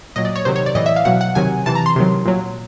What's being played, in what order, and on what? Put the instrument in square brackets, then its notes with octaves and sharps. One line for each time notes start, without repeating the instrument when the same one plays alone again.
[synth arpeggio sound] A#2 F#3 D#5
D5
C#5
C3 D#3 F#3 C5
C#5
D5
A2 E3 D#5
E5
F5
B2 F#3 F#5
F#5
C3 D#3 F#3 G#5
C3 E3 A5
A#5
C6
C3 D#3 F#3
A#2 F#3